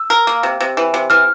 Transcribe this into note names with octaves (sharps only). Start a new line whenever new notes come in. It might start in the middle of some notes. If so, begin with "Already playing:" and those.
Already playing: E6
A#4
A#3
C3
C3
E3
C3
E3 F6